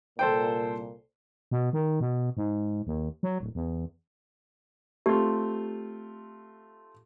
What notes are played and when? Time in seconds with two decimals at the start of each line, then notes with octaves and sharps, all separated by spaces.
0.19 C2 A#2 A4 C5 G5
1.51 B2
1.73 D#3
2.00 B2
2.37 G#2
2.87 D#2
3.23 F#3
3.40 D1
3.55 E2
5.06 A3 C4 F4 G4